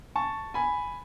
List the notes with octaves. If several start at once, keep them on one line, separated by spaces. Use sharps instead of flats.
A5 C#6
G#5 B5